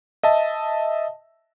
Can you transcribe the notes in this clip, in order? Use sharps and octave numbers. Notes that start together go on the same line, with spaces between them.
D#5 E5 A5